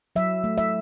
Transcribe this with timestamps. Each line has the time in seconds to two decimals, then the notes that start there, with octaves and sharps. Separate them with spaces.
0.16 F#3 E5
0.44 A3
0.58 E5